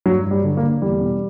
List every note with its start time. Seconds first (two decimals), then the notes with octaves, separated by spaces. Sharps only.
0.06 G2 F#3
0.26 G2
0.31 G3
0.44 D3
0.57 A#3
0.63 D3
0.82 E2 G3
1.01 B2